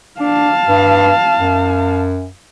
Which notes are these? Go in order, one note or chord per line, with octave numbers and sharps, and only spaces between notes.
D4 F5 A5
G2
F#2